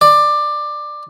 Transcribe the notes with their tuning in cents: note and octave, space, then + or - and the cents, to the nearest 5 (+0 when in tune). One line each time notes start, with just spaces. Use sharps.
D5 +15